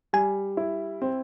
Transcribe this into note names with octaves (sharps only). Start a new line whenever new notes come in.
G3 G#5
E4
C4